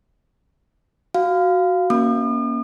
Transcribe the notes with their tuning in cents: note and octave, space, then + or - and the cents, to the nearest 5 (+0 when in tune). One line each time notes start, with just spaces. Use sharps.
F#4 +0 F5 +0
A#3 +20 C#4 +0 D#6 -45